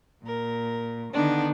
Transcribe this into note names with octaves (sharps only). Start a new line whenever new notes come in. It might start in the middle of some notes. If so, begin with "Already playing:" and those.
A#2 A#4
D3 D#3 B3 D4 D#4